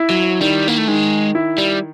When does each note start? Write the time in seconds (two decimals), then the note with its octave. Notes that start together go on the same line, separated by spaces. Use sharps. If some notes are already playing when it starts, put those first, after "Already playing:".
Already playing: E4
0.10 F#3
0.41 D#3 G3
0.68 A#3
0.78 A3
0.88 D#3 G#3
1.35 E4
1.58 G3